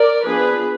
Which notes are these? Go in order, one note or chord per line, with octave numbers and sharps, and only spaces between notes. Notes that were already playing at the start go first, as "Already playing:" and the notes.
Already playing: A#4 D5
F3 B3 D4 G#4 B4